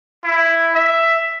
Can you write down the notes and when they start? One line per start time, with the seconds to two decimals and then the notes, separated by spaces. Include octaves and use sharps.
0.24 E4
0.75 E5